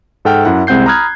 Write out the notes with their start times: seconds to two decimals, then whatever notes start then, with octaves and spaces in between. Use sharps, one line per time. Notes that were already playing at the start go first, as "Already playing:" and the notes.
0.25 G#2 A4 F#5 G5 F6
0.45 F#2 E4 F#5
0.67 C2 G#3 C4 F#5 G6 C7
0.86 A#5 B5 D#6 F6 F#6 G#6